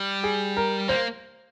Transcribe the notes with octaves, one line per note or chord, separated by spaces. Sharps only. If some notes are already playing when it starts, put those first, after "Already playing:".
Already playing: G3
G#4
A#4
A#3 C5